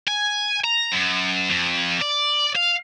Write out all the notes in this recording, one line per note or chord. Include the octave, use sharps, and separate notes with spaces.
G#5
A#5
F#2
F2
D5
F5